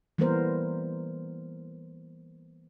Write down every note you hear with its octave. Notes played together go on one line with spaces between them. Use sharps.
E3 G3 A#3 B3 A#4 C5